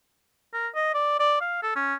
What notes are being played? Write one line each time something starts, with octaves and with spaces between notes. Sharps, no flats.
A#4
D#5
D5
D5
F5
A4
C#4